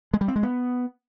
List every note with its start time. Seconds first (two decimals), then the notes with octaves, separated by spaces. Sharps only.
0.14 G#3
0.21 G3
0.28 C4
0.36 G#3
0.43 B3